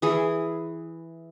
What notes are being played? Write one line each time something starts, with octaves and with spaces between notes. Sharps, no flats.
E3 G#4